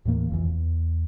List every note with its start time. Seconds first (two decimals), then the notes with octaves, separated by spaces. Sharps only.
0.05 D#2 A2 E3 A#3
0.30 F1 B1 F2 E3
0.45 E2